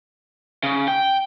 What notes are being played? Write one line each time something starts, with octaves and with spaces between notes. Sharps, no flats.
C#3
G5